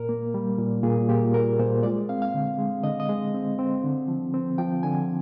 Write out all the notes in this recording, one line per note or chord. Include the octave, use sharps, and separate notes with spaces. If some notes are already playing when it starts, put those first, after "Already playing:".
Already playing: A#2 A#4
A#3
G3
A#2
A#2 G#4
A#2 G4
A#3 A#4
A#2 C5
G#3 D5
C4 F5
F5
D3
G#3
D3 D#5
D#5
G#3
C4
C4
D3
F3
C4
F3 G5
D3 G#5